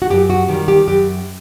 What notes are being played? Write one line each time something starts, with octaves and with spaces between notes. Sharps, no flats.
F#4
F#2 G4
F#4
D#3 G3 G4
G4
F#2 G4